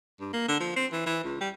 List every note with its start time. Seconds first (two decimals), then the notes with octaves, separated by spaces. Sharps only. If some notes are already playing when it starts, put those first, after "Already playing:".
0.20 G2
0.33 A#3
0.48 D3
0.60 F3
0.76 C4
0.92 E3
1.06 E3
1.24 C#2
1.41 G3